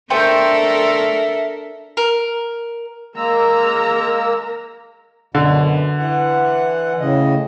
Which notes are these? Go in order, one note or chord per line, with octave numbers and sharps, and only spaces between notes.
A3 D4 A4 A#4 C5 E5 G5
A#4
G#3 A#3 A#4 A#5 E6
F#2 B2 D3
E3 F#5
A2 C#3 D#5